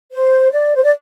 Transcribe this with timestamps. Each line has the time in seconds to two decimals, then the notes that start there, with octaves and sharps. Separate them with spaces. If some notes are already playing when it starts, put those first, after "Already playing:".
0.13 C5
0.51 D5
0.75 C5
0.83 D5